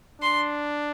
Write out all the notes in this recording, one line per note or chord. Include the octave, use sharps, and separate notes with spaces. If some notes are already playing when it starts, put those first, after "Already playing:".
D4 C6